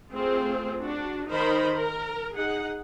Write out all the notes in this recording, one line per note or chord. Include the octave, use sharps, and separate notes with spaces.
A3 C4 F4 G#4
D4 F#4
D#3 D#4 A#4 C5 B5
A#4
D#4 G#4 F#5